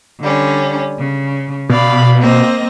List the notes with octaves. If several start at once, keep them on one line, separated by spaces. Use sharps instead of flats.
D3 G3 C#4
C#3
B2 D5 F5 B5
A#3 C4 D#5